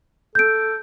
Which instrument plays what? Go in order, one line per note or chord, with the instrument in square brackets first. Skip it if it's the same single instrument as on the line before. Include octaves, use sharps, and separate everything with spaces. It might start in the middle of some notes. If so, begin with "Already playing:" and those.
[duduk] A4 [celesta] G6 D7